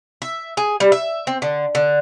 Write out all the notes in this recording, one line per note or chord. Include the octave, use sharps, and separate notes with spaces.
E5
G#4
G3
E5
C4
D3
D3